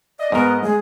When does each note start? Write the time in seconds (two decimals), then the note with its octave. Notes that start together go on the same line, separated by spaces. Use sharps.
0.19 D5 D#5
0.32 G#2 B3 A#4
0.63 G#3 G#4